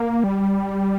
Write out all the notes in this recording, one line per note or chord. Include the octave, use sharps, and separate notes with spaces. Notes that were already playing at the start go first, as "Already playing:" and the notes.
Already playing: A#3
G3